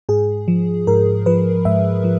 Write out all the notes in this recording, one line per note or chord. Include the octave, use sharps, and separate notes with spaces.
G#2 G#4
F3
G#2 A#4
F3 B4
G#2 E5
F3